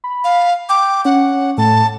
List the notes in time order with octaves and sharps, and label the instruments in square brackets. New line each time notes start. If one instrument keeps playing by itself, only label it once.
[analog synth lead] B5
[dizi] F5
[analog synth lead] G5 [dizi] D6
[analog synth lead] C#4 [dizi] F#5
[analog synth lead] A2 [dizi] A5